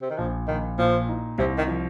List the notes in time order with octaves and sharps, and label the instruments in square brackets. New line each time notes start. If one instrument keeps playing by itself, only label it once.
[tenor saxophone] C3
D#3
[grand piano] A#1 [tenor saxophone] F3
[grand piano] A#1 [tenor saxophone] D#3
[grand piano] A#2 [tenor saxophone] F3
[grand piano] D#4
[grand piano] C2 [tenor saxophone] C3
[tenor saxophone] D#3
[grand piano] F3